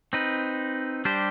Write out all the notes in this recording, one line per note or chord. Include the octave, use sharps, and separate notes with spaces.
C4 D#4 B4
G3 D4 G4 C5